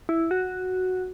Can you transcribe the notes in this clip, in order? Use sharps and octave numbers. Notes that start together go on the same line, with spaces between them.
E4
F#4